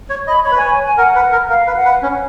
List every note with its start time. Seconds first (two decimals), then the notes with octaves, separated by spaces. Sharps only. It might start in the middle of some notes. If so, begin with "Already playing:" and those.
0.10 C#5
0.27 D#5 B5
0.45 C#5 B5
0.51 B4
0.58 C#5 G#5
0.72 G#5
0.84 G#5
0.97 A#4 F#5
1.15 B4
1.32 A#4
1.49 A#4 F5
1.67 B4
1.76 F#5
1.85 B4
2.03 C#4